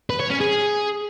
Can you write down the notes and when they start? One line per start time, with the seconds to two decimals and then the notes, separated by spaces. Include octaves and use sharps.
0.10 B4
0.20 C#5
0.30 C#4
0.41 G#4